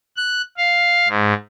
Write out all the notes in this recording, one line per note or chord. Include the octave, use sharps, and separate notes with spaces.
F#6
F5
G#2